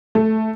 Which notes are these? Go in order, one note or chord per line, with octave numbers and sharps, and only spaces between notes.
A3